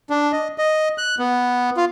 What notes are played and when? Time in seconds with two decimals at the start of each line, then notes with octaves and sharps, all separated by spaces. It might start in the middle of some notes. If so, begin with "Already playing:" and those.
0.10 D4
0.32 D#5
0.58 D#5
0.98 F#6
1.19 B3
1.77 F4